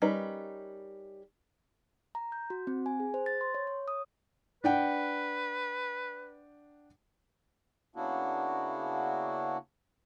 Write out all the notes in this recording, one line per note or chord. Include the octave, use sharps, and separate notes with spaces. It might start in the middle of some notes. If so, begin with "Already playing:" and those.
G3 C#4 D#4 A#4 B4
A#5
G6
F#4
C4
G#5
G#4
C5
A6
C6
C#5
C#5
D#6
D4 B4 F#5 G5
C#3 A#3 B3 D4 E4 F#4